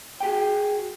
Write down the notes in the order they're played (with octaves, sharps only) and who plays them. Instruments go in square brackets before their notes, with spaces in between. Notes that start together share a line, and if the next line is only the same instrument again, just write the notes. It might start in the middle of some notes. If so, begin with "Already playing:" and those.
[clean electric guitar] F#4 G#4 G5